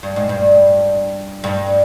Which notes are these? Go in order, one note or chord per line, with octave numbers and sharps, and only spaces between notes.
G2
G#2
G2
G2